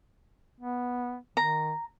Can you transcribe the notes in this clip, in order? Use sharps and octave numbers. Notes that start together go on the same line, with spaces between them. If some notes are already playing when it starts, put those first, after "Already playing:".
B3
D#3 A#5